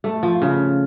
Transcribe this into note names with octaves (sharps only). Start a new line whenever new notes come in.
A3
F3
C#3